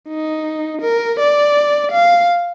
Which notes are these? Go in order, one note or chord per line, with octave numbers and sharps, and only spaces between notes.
D#4
A#4
D5
F5